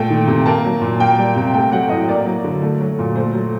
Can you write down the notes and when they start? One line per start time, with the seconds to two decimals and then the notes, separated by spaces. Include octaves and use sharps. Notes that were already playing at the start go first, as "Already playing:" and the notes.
Already playing: A#2 A3 G5
0.10 D#3
0.27 C3
0.46 A#3 A5
0.65 F#3
0.81 A#2
1.00 A#3 G5
1.18 G3
1.36 C3
1.53 A3 G5
1.71 F#3 F#5
1.90 A2 D#5
2.08 A#3 D5
2.26 F#3
2.44 D3
2.62 A3
2.81 F#3
2.99 A#2
3.16 A3 C5
3.34 F#3